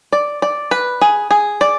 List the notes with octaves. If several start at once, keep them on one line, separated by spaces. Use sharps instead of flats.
D5
D5
B4
G#4
G#4
D5